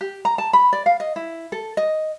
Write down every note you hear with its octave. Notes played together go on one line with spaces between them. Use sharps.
G4
A#5
A5
B5
D5
F5
D#5
E4
A4
D#5